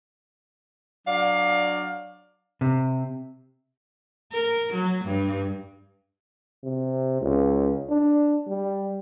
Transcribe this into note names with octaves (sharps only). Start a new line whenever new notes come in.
F#3 D4 D5 F5
C3
A#4
F#3
G2
C3
C#2
D4
G3